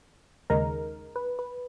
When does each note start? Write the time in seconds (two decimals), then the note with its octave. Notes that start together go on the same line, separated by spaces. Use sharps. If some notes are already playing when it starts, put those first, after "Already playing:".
0.50 D#2 C#3 G#3 D#4 A#4
1.16 B4
1.39 B4